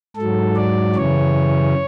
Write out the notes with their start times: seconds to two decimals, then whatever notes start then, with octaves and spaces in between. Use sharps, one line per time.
0.16 G#2 A4
0.22 F#3
0.56 D5
0.96 F#2 C#3 E3 C#5